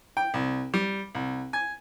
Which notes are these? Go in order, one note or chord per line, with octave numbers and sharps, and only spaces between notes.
G5
C2
G3
C2
G#5